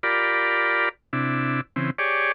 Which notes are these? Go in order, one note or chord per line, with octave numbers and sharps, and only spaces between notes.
F4 G4 A#4 D5 B5
C3 D4 E4
C#3 E3 C4
G4 G#4 C#5 D5